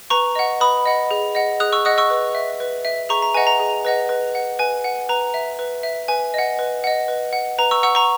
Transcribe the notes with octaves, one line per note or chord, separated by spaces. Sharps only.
B4 A#5 C#6
D#5 F#5
B4 B5 D#6
D#5 F#5
G#4
D#5 F#5
G#4 D#6 F#6
C#6 E6
D#5 F#5 D#6 F#6
C#6 E6
B4
E5
B4
E5
G#4 A#5 C#6
A#5
B4 D#5 F#5 G#5
A#5
G#4
B4 D#5 F#5
B4
F#5
B4 G#5
F#5
B4 A#5
E5
B4
E5
B4 G#5
D#5 F#5
B4
D#5 F#5
B4
F#5
B4 A#5
C#6 E6
F#5 C#6 E6
A#5 C#6